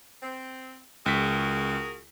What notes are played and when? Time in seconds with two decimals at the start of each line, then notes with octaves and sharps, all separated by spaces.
0.23 C4
1.06 C#2 F#4 G#4 A#4 B6